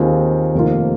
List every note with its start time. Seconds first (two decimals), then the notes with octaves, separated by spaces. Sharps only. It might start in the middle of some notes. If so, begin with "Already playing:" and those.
Already playing: D#2 D#3 C4 F4 G#4
0.54 F1 F2 D#3 A#3 F4